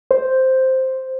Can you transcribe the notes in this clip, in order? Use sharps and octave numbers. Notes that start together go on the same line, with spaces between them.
C5